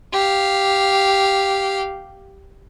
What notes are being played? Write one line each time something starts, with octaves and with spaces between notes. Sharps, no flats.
G4 F5